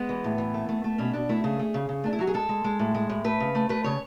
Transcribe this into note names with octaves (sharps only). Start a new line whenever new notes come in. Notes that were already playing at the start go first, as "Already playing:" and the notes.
Already playing: G#3 B3
E3
A2
E3
A3
A3
A3
B2 C#4
B2 D4
A3 E4
C#3 G#4
A3
C#3
C#3
A3 D4
E4
F#3 F#4
G#4
G#3 A4
G#3
G#3
A2
G#3
A2
A3 B4
C#3
A3
A3 B4
C#3 C#5